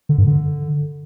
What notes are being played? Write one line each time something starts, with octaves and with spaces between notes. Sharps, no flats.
D3
G2
D3